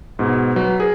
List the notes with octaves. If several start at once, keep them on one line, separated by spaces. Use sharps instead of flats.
G#2 B2
F#3 B4
G#4 A#4